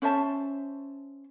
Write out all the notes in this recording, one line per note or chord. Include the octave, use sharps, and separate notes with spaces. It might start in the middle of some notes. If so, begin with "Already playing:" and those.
C#4 C5 E5 A5